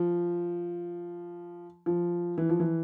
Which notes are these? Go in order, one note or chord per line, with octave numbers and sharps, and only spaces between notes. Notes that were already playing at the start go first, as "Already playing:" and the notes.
Already playing: F3
F3
E3
F3
E3